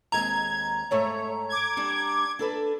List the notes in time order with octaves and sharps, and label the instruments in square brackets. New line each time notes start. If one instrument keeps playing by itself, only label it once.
[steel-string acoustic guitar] D#2 G#3 C4 [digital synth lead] A#5 [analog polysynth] G#6
[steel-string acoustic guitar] G#2 A3 E5 [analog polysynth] C#5
[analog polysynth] D6 G#6
[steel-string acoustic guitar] G3 D4
D4 A4 B4